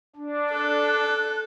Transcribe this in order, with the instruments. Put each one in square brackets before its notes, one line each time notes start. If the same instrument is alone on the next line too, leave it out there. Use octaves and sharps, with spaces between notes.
[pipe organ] D4
[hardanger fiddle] A4 [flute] F#6